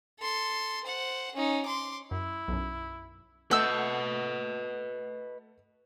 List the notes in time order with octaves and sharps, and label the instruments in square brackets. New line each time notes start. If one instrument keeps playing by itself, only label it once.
[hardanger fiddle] A4 C6
C5 F#5
C#4 D#4
C6 D6
[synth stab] F#2 [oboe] E4
[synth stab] B1 F#2
[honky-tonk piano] A3 A4 F#5 [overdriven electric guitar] B4 D#5 [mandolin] E6 G6